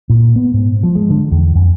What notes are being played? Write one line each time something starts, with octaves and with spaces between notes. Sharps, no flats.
A#2
B3
G#2
F3
G#3
D3
E2
F2